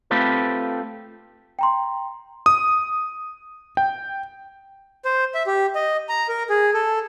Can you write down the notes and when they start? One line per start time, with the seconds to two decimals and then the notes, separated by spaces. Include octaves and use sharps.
0.11 A3 C4 F4 G4 A4 B4
1.59 G5 A#5 C6
2.46 D#6
3.77 G5
5.05 C5
5.35 E5
5.47 G4
5.75 D#5
6.09 A#5
6.29 A#4
6.50 G#4
6.74 A4